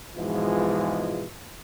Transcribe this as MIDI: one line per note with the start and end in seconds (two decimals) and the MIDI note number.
0.16 1.24 44
0.16 1.24 47
0.16 1.24 52
0.16 1.24 53
0.16 1.24 56
0.16 1.24 65